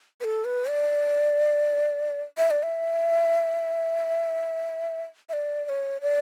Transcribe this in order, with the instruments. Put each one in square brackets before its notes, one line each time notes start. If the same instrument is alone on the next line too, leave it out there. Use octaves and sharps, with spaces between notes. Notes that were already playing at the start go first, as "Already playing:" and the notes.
[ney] B4
A4
B4
D5
E5
D5
E5
E5
D5
D5
C#5
D5